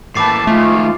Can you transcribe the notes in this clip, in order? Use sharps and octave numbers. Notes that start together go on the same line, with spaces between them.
A2 E3 A3 A#3 A5 D6 A6 C7
D#3 F3 G#3 A3 F4